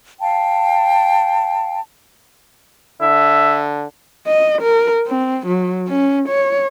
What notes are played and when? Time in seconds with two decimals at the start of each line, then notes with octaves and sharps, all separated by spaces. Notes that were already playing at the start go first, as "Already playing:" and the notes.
0.20 F5 G5 A5
3.01 D3 E5
4.27 D#5
4.62 A#4
5.07 C4
5.47 F#3
5.88 C#4
6.29 C#5